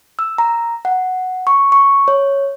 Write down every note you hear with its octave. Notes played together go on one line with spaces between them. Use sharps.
E6
A#5
F#5
C#6
C#6
C#5